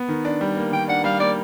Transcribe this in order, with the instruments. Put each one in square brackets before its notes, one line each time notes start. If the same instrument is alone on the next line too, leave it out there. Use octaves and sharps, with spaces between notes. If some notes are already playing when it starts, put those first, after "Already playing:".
Already playing: [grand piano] B3
D#3
D4
G3
A#3
[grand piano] D#3 [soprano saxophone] G5
[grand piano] D4 [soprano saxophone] F#5
[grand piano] G3 [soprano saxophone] F5
[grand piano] A#3 [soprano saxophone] D5